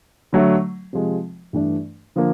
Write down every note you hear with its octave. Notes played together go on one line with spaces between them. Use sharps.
D3 F#3 A3
C3 F3 G#3
G2 E3 A3 D4
D3 F3 A#3